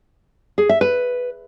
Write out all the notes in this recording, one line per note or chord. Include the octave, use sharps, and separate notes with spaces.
G#4
E5
B4